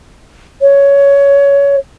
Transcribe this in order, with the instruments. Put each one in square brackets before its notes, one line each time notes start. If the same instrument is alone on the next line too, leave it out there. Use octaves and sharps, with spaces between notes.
[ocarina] C#5